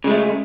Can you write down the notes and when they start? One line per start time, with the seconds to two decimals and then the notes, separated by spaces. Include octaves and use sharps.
0.04 C#3
0.07 G#3
0.10 A3